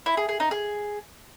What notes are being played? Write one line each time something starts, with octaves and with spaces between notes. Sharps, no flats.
E4
G#4
G#4
D#4
G#4